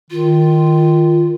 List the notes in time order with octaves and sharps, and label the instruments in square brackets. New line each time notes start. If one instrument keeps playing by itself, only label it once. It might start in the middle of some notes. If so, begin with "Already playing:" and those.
[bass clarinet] D#3 [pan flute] F4